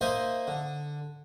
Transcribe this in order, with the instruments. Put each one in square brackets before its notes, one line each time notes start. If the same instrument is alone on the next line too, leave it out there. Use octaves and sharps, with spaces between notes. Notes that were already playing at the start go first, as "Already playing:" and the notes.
[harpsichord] A#3 D#4 C5 D#5 E5
D3